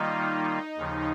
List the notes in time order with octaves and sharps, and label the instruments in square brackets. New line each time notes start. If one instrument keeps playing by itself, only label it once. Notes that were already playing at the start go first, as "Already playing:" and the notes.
Already playing: [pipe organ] D#3 G3 A#3 F4 [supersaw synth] D#4
[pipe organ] D#2 C#3 F3